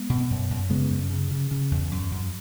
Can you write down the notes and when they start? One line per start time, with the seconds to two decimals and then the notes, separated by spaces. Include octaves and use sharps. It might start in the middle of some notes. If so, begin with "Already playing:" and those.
Already playing: G#3 B3
0.10 B2
0.30 F#2
0.50 F#2
0.70 C#3 G#3 B3
0.91 F#2
1.10 C#3
1.31 C#3
1.51 C#3
1.71 E2
1.91 F#2
2.11 F#2